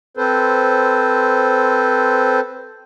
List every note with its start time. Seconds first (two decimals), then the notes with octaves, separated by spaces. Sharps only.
0.17 C4 A4 B4 C5